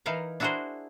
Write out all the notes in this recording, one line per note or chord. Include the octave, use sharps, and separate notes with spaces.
E3 D#4 E4 A#4 F5 A#5
D4 E4 F#4 G#4 A#4 C5